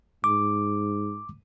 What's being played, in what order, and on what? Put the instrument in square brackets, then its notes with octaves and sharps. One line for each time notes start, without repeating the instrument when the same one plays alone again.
[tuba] G#2 [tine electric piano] D6